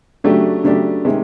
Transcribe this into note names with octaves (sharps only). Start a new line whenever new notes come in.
C#3 F#3 A3 D4 G4
C#3 F#3 A3 D4 G4
C3 D#3 G#3 C#4